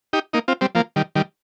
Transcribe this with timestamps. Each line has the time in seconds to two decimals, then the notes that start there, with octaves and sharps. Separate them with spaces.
0.13 D#4 G4
0.33 A#3 D#4
0.48 C4 F4
0.61 G3 C4
0.75 F3 A#3
0.96 D#3 G3
1.15 D#3 G3